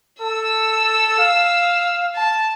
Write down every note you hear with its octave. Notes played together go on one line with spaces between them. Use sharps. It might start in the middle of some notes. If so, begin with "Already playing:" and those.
A4 E6
F5
A5